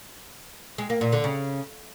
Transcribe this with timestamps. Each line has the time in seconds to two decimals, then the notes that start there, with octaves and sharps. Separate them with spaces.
0.78 G#3
0.90 A#3
1.01 A#2
1.12 D3
1.24 C#3